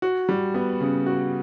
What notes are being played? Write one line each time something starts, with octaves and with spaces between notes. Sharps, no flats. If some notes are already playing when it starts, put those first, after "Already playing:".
F#4
G3
B3
C#3
F#4